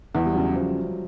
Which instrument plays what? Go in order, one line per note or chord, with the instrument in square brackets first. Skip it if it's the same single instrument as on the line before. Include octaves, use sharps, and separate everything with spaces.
[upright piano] E2 [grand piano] E3
[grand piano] G3
[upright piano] C#3 [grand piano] F#3
[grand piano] F3